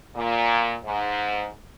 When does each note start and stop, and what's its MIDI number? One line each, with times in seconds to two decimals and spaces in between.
0.15 0.74 46
0.84 1.47 44